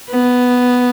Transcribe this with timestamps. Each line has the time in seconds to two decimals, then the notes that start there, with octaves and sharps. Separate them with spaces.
0.10 B3